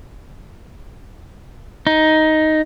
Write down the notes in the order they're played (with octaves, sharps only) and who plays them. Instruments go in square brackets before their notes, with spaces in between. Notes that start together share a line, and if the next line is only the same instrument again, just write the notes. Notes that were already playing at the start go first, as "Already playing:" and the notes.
[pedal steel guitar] D#4